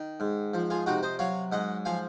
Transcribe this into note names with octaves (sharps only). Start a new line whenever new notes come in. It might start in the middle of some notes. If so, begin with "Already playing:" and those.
Already playing: D#3
G#2
F3
F4 G#4
C3 D#4 F#4
C5 D#5
F#3 C#5 F5
G#2 D#5 F#5
F3 F5 G#5